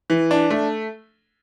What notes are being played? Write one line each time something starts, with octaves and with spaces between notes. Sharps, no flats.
E3
D4
A3